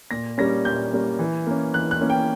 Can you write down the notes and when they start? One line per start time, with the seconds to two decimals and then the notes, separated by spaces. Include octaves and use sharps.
0.11 A#2 A#6
0.38 G3 A#3 C#4 A#6
0.65 A#2 G6
0.93 G3 A#3 C#4
1.19 E3
1.47 A#3 C#4
1.74 E3 F#6
1.91 F#6
2.01 A#3 C#4
2.10 G5